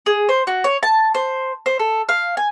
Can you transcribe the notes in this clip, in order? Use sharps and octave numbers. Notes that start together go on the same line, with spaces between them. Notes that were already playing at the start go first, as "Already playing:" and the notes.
G#4
C5
F#4
C#5
A5
C5
C5
A4
F5
G#5